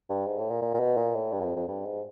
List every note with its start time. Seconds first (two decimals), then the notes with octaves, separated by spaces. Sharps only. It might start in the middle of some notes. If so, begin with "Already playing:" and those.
0.09 G2
0.27 G#2
0.39 A2
0.51 A#2
0.62 A#2
0.74 A#2
0.80 B2
0.97 A#2
1.15 A2
1.33 G2
1.41 F#2
1.44 F2
1.56 F2
1.68 G2
1.85 G#2